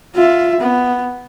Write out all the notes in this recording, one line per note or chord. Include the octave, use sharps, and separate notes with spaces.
F4 E5
B3